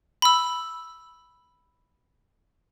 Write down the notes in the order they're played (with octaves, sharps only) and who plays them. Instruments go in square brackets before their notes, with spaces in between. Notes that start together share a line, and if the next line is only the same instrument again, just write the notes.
[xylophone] B5 E6